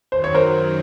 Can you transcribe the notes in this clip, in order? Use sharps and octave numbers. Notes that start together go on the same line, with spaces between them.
F#2 D#3 F#3 C5
C#5
A#4 C5